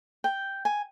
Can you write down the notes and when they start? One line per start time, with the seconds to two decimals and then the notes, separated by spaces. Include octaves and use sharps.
0.24 G5
0.65 G#5